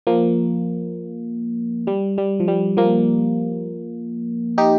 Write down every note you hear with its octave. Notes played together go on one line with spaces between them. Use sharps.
F3 A#3
G3
G3
F3
G3
F3 A#3
D#4 G4